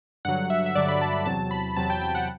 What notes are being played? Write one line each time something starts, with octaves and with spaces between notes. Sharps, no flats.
G2 D3 F#3 F#5
E5
E5
G2 D3 F#3 D5
B5
A5
B5
E2 C3 F#3 C4 A5
B5
E2 C3 F#3 C4 A5
G5
G5
F#5